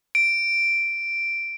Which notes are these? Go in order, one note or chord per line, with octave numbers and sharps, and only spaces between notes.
D7